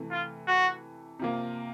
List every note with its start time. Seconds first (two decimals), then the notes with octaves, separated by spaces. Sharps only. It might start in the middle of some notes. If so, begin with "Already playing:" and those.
Already playing: C3 E3 A3
0.11 F4
0.47 F#4
1.19 C3 F3 A#3